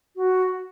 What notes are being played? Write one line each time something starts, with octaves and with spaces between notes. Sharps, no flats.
F#4